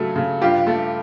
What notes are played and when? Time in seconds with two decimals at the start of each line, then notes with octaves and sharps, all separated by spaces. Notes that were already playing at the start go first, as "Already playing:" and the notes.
Already playing: C#3 F#3 A3
0.16 C#3
0.41 G2 F4 G4
0.67 A3